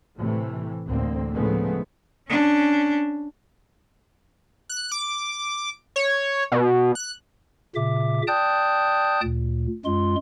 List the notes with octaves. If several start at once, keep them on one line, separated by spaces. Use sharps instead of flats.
A2 C3 E3 A3
A1 D2 A#3 C4
A2 C#3 F3 G#3 A3 B3
C#4 D4
F#6
D6
C#5
B2
F#6
A#2 C#3 E5 D6
D5 G5 A5 D#6 F#6 G6
D2 A#2
F#2 G#3 F4 C6